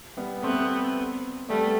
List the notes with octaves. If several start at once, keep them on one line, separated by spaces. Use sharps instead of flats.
G3 B3
A3 B3 C4
G3 A3 B3